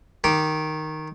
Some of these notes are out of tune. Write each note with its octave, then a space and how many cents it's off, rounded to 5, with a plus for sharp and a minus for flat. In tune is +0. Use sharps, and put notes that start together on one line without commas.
D#3 +0 G4 -15